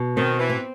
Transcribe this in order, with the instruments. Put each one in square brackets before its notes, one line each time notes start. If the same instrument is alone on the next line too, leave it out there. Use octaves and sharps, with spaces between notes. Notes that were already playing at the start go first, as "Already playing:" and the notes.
Already playing: [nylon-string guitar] B2
[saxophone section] D#3 [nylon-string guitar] C4
[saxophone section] E3
[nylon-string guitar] C4